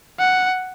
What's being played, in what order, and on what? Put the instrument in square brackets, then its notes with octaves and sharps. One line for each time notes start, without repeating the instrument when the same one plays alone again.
[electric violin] F#5